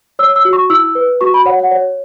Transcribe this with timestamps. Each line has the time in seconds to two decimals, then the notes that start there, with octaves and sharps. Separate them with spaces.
0.19 C#5 E6
0.36 E6
0.45 F#4
0.53 C#6
0.70 E4 E6
0.95 B4
1.21 F#4 C#6
1.34 B5
1.46 C#5 F#5
1.59 F#5
1.71 C#5